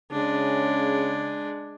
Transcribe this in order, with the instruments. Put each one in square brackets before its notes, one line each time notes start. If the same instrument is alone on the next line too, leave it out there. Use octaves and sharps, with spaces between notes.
[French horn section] C#3 [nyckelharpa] G#3 D4